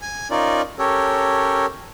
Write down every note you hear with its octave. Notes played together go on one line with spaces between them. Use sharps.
G#5
C#4 D#4 F4 A#4 D5
C#4 G4 A4 A#4 C#5